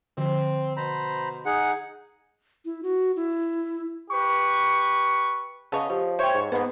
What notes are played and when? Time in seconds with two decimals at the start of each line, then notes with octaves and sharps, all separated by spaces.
0.18 D3 F3 C4
0.77 B2 C5 A#5 B5
1.46 D#4 G#4 F#5
2.65 E4
2.83 F#4
3.16 E4
4.10 G4 B4 C#6
5.72 C#3 B3 C#5 D#5 A5
5.90 F3 G4
6.19 C5 C#5 E5 G5
6.34 G#2
6.52 G#2 F3 A#3 B3 B4